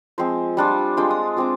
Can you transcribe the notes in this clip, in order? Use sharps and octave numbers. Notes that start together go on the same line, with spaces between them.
F3 G#3 C4 C5
G3 D4 F4
G#3 D4 F4 G5
D#6
G#3 C4 F4 D6